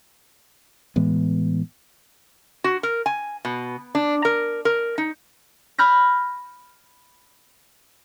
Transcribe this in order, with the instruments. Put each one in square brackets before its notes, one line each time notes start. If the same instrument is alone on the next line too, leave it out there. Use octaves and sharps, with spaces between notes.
[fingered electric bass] A2 E3 G#3 B3
[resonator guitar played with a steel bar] F#4
A#4
G#5
B2
D4
A#4
A#4
D#4
[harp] B5 F6 G6 A#6